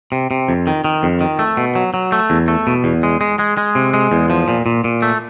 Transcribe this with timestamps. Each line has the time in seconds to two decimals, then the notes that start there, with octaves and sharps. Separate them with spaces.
0.12 C3
0.31 C3
0.49 F2
0.67 D#3
0.84 D#3
1.03 F2
1.21 D#3
1.39 A3
1.57 B2
1.75 F#3
1.94 F#3
2.12 A3
2.30 E2
2.48 A3
2.67 B2
2.84 E2
3.03 G#3
3.21 G#3
3.39 G#3
3.57 G#3
3.75 C3
3.94 G#3
4.12 E2
4.30 F3
4.48 A#2
4.66 A#2
4.84 A#2
5.02 A3